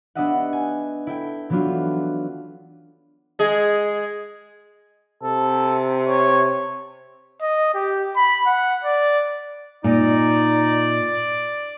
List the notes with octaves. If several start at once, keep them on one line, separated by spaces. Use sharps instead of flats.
B3 D4 G4 D#5 E5 F#5
G#5
E4 A4 G5
E3 F#3 B3 D4 F4 F#4
G#3 G#4 D#5
C3 A4
C#5
D#5
G4
B5
F#5
D5
A#2 D#4 D5